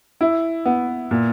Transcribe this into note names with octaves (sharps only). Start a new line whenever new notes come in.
E4
B3
A#2